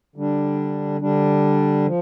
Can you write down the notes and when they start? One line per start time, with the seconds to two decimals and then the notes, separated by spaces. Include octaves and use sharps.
0.16 D3 G3 D4
1.01 D3 G3 D4
1.86 F3